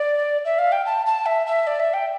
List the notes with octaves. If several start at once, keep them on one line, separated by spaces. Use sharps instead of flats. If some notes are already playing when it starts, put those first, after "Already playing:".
Already playing: D5
E5
F5
G5
A5
A5
E5
E5
D5
E5
G5